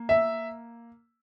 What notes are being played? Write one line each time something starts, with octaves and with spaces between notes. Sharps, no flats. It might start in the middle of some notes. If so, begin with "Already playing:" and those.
Already playing: A#3
E5